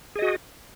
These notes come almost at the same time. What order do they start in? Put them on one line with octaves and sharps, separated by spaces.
G#4 D#5 F#4